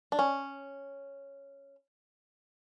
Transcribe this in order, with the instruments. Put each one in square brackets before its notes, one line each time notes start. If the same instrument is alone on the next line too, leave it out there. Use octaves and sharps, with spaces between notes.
[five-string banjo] D4
C#4